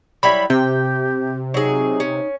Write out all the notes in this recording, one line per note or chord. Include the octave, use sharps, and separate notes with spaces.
F#3 G3 E4 B5
C3 G4 G5
F#3 D#4 G#4
C#4